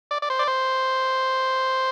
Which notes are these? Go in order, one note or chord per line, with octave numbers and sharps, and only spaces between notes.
D5
D5
C5
D5
C5